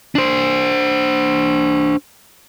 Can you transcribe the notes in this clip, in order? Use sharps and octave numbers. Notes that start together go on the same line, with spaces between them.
D4 C5